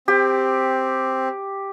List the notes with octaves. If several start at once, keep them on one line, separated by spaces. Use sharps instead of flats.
C4 G4